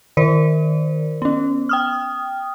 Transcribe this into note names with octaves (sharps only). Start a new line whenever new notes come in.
D#3 A#4 C5 D5
B3 C#4
G5 D#6 F6